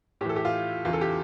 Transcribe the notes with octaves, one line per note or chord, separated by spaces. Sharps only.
A2 E3 G4 A4
G4
F4
E2 C#3 E3 F4
A4
G4